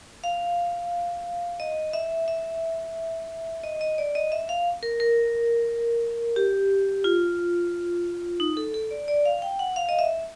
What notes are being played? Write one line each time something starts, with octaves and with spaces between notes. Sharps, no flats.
F5
D#5
E5
E5
D#5
D#5
D5
D#5
E5
F5
A#4
A#4
G4
F4
D#4
A4
A4
D5
D5
F5
G5
F#5
F5
D#5
E5